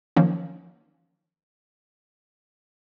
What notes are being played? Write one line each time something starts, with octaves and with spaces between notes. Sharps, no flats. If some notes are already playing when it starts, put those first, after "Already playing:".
D#3 F3 F#3 A#3 C#4